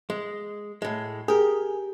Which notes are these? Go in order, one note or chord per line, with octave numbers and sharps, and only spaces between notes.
G#3
A2 G#3
G4 G#4 A#4